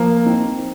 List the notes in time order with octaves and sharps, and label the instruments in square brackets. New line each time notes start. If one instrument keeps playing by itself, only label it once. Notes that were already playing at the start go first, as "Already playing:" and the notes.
Already playing: [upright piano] F3 A#3 A#4
C4 D#4